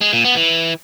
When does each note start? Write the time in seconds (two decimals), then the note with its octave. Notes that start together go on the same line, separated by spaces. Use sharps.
0.01 G#3
0.13 A#2
0.25 B3
0.36 E3